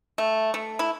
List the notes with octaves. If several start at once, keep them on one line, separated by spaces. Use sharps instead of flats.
A3
A3
E4